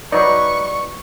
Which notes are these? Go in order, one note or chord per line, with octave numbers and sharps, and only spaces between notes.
F#3 D#4 B4 D5 C#6